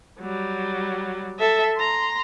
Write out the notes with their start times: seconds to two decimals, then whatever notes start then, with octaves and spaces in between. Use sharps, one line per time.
0.20 F#3 G3
1.39 A4 E5
1.77 A#5 C6